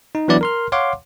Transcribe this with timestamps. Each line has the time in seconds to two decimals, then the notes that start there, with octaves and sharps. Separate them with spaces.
0.15 D#4
0.28 E3 F#3 B3 D4 E4 D5
0.41 A#4 C6 F6
0.72 C#5 F5 F#5 C6 D6